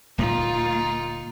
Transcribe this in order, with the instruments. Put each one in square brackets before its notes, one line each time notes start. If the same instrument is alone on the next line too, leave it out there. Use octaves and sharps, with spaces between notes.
[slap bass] D1 A#2 G3 [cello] A#3 F4 [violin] D#4